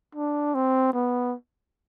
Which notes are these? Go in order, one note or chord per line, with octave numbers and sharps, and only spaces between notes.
D4
C4
B3